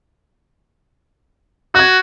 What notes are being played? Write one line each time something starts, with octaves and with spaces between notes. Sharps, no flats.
F#4 F#6 G#6